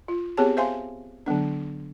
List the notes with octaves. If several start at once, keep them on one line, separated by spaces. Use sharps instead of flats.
F4
B3 C4 G4 G#4 C#5 A5
C5 E5 F5 G#5 C6
D3 F#3 B3 D4